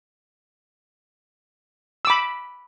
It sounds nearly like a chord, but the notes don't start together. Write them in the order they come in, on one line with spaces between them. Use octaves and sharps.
E6 D6 B5